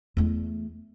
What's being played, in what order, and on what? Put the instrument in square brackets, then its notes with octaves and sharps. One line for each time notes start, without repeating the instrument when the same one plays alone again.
[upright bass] E2 A3